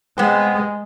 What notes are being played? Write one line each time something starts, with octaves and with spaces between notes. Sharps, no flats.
G#3 B3 C4